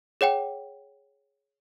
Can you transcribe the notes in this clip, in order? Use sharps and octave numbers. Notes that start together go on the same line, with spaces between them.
G#4 C#5 F#5 G5